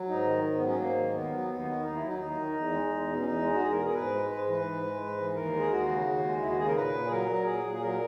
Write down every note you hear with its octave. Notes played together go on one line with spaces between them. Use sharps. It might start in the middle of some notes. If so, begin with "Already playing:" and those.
Already playing: F#3
G#2 D#4
D#3
G#2
B3
F#3
C#4
G#2 A#3
D#3
D#2 B3
F#3
D#2 B3
D#3
D#2 D#4
E4
F#3 D#4
D#2 D#4
D#3
E2
G#3
E2
B2
C#4
E2 D#4
G#3
F#4
E2 G#4
A#4
B2
G#4
A#4
G#2 B4
G#3
G#2 B4
E3 B4
G#2
G#3
G#2
E3
D#2 A#4
G#3
G#4
D#2 F#4
C#3
D#2
G#3
D#2 E4
F#4
C#3 G#4
A#4
A#2 B4
A#2
G#4
F#3 A#4
F#3
A#2 G#4
A#2
G#4
F#3 A#4